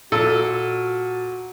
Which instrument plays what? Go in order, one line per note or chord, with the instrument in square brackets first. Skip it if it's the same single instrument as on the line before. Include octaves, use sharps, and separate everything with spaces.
[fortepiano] A#2 A4 E6 [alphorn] F#4